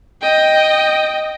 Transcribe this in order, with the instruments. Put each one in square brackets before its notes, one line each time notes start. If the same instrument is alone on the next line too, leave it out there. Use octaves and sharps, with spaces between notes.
[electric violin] D#5 G5